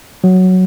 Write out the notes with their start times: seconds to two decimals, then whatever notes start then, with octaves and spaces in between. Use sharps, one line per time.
0.24 F#3